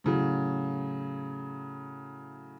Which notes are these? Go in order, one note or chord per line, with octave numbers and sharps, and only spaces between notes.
A2 C#3 F#3